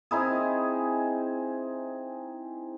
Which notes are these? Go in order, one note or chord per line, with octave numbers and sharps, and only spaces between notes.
C4 D#4 E4 G#4